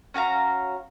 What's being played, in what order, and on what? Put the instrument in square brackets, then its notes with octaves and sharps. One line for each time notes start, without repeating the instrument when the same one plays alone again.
[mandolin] C#4 F#4 F5 A#5